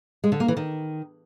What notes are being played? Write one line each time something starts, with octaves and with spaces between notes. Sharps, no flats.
G#3
D3
A#3
E3
D#3